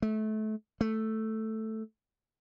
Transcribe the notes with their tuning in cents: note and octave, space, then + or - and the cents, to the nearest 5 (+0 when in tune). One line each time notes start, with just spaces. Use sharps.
A3 -25
A3 +0